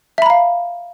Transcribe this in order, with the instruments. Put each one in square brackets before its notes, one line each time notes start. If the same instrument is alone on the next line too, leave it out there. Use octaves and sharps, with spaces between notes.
[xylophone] E5
B5
A#5
F5